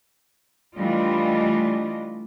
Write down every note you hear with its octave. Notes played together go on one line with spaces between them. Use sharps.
E3 G3 A3 D4 F4 D#5